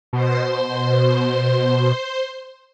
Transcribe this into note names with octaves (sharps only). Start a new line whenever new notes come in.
B2 C5 C6